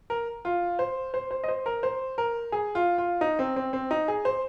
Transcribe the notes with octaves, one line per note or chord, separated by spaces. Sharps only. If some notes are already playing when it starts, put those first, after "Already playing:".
A#4
F4
C5
C5
C5
D#5
C5
A#4
C5
A#4
G#4
F4
F4
D#4
C4
C4
C4
D#4
G#4
C5